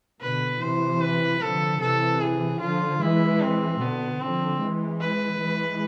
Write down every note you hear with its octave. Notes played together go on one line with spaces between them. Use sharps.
B2 D3 B4
C3 E3 C5
B4
D3 F3 A4
C3 E3 A4
G#4
D3 F3 F4
E3 G#3 E4
C4
B2 D3 B3
D3 F3 C4
E3 G#3
B4
E3 G#3